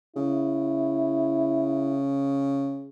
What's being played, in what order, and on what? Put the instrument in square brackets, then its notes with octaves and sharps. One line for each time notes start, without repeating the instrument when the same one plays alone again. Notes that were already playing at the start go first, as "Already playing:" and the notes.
[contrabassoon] C#3 [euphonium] E4